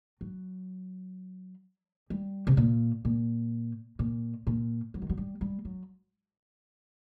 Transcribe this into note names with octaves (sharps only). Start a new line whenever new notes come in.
F#3
G3
C3
A#2
A#2
A#2
A#2
F#3
D#3
F#3
G3
G3
F#3